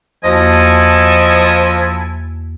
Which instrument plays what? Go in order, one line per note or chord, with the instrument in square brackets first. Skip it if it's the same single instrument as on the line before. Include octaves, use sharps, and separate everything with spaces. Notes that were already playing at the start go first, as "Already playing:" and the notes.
[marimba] E2 A#3 F#4 [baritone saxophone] F3 [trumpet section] E4 A4 G#5 [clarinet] D#5